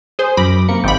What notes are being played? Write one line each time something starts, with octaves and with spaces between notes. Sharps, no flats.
G#4 C5
F#2 B5 D6 A#6
C3 A#3 C#7
G#1 F4 D5 G5 B5